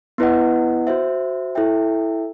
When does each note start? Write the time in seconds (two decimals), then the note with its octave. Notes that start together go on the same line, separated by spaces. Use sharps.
0.18 B3 E4 B4 D#5 F#5
0.87 F#4 C5 E5
1.55 E4 A4 E5 G5